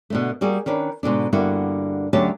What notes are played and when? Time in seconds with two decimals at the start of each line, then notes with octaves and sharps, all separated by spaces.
0.10 B2 D3 A3
0.41 G3 A#3 F#4 G#4
0.66 D#3 C#4 D4 B4
1.03 G#2 B2 D3 D4
1.33 G2 D3 A#3 B3 E4 F#4
2.13 D2 D3 F#3 C#4 G4 A5